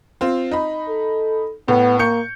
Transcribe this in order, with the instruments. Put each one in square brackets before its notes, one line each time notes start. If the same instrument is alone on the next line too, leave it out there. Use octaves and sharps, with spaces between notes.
[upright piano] C4 F4
D#4 B5
[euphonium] A4
[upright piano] A2 [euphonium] B3
[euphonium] A#3 [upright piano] C#6 G6 C#7